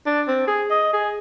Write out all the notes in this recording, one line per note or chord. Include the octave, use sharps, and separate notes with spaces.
D4
C4
G#4
D#5
G#4